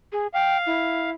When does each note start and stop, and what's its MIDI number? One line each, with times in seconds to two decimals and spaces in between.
0.12 0.27 68
0.34 1.10 77
0.34 0.58 79
0.66 1.13 64